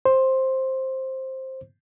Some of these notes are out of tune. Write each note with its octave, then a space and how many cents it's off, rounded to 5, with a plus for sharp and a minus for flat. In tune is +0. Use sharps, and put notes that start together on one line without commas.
C5 +10